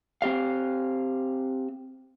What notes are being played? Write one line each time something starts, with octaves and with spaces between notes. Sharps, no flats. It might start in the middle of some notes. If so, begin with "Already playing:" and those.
C4 G4 F5